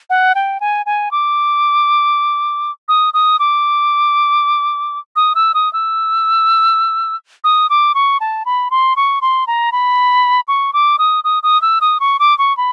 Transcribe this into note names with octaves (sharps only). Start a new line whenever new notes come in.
F#5
G5
G#5
G#5
D6
D#6
D#6
D6
D#6
E6
D#6
E6
D#6
D6
C#6
A5
B5
C6
C#6
C6
A#5
B5
C#6
D6
D#6
D#6
D#6
E6
D#6
C#6
D6
C#6
B5